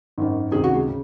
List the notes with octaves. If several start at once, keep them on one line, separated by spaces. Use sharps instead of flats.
G#1 F#2 D#3
C#2 C3 D#3 G#4
F#4
G#3
C#3